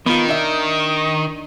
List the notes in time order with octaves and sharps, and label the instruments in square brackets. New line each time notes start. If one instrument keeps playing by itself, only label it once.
[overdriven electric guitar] D#3 [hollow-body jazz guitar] B3 F4
[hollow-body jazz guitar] D4 E5